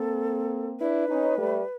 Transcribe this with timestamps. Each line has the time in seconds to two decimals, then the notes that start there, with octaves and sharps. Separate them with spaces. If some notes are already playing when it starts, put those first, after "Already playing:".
Already playing: A#3 C4 A4
0.80 D4 E4 B4
1.09 C#4 D#4
1.37 G3 A3